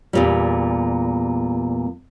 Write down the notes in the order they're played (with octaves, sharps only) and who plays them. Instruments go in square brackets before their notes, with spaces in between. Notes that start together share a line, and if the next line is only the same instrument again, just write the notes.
[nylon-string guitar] E2 A#2 G3